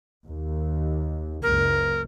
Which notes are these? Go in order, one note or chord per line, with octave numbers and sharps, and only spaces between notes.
D#2
F#1 C#2 A#4